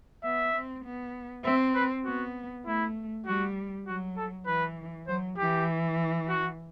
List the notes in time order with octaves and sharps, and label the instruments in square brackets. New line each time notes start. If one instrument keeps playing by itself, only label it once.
[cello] B3 [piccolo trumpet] E5
[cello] C4
B3
[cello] C4 [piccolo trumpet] E5
[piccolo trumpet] B4
[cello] B3 [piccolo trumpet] F#4
[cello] A3 [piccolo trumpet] E4
[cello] G3 [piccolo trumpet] F#4
[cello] F#3 [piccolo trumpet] F#4
[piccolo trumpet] A4
[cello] E3 [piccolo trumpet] B4
[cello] F#3 [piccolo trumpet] C5
[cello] E3 [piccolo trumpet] G4
[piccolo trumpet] F#4